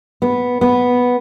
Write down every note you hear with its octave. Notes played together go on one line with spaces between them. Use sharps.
B3
B3